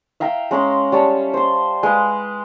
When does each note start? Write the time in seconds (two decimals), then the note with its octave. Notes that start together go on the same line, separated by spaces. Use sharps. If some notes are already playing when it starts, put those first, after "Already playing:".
0.20 E5 F5 G5 A#5
0.51 G#3 C#4 A#5 C6
0.92 G3 C#5 A5
1.34 C5 C6
1.83 G#3 B4 F5